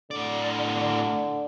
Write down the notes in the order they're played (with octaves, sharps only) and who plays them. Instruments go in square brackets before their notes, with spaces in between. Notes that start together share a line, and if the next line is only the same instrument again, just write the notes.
[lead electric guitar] A2 D5 [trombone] D3